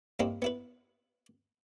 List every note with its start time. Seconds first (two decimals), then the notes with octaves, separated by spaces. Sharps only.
0.19 G2 A#3 C4 D#4 E4
0.42 B3 E4 B4